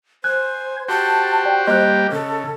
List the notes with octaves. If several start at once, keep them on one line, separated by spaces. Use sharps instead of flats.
C5 G#5 F#6
F#4 G4 C5 A5
D5 G5
G3 A#3 G4 C5 D#5 F#6
C#3 A4